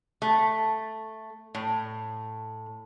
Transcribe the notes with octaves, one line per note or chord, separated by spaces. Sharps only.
A3
A2